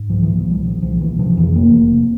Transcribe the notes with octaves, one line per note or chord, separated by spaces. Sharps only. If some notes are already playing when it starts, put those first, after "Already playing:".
Already playing: G#2
C2 F3
E3
A#2
F3
C2 G3
A#2 F3
C2 F3
A#2 E3
C3 F3
F2 E3
F1 A#3
F1
C3